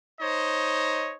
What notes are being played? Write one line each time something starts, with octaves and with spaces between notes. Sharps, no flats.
D#4 C5 C#5 D#5